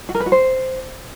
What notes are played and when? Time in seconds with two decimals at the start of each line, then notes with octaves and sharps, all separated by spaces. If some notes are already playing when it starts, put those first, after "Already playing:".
0.09 F#4
0.15 A#4
0.20 B4
0.26 F#4
0.32 C5